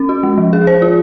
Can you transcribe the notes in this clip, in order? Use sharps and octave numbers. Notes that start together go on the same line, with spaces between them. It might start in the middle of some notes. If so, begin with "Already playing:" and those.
Already playing: C#4
F#4
G#3
F3
G#4
C5
F4